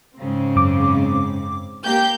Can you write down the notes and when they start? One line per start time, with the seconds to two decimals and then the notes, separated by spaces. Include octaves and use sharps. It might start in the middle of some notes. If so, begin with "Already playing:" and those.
0.18 G#2 C#3 C4
0.56 F#2 D6
1.84 A#3 G4 G6